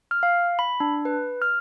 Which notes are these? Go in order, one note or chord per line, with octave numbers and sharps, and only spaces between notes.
F6
F5
B5
D4
B4
F6